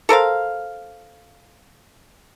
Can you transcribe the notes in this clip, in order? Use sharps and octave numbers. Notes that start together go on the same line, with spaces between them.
A4 A#4 C5 F5